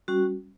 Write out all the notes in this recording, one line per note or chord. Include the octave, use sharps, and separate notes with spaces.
G3 C#4 F#4